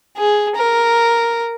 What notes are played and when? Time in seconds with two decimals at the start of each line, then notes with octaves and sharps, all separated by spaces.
0.17 G#4
0.56 A#4